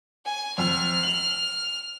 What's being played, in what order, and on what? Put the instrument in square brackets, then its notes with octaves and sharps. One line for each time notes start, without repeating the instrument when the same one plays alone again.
[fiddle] G#5
[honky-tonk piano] F2 [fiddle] F6
[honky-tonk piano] F#7